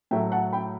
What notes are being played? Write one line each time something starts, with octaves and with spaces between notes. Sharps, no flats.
A2 F#3 A3 E5 G5
F#5 A5
G5 B5